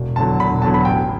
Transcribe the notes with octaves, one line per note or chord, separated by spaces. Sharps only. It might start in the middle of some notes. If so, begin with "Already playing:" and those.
Already playing: E1
E2 D3 F#3 A5
E1 B5
E2 D3 F#3 A5
B5
A1 G5